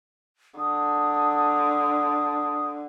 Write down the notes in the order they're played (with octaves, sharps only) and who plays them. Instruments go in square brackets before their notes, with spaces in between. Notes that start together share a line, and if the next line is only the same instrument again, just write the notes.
[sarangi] D3 [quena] D#6